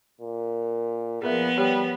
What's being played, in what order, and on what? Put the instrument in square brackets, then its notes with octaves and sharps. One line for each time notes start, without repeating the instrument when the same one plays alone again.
[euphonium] A#2
[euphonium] A#2 [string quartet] F3 B3 [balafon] G#4 A#4 E5
[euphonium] G3 [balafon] G4 C#5